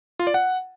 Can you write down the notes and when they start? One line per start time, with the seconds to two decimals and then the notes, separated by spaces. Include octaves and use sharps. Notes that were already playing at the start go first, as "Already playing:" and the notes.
0.19 F4
0.27 D5
0.34 F#5